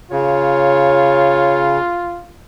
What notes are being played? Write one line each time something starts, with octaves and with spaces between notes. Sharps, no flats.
C#3 F4 C#5